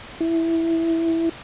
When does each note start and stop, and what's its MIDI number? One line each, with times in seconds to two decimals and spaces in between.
0.21 1.29 64